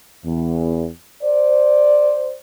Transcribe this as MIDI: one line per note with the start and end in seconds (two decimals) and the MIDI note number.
0.25 0.87 40
1.23 2.36 72
1.23 2.36 74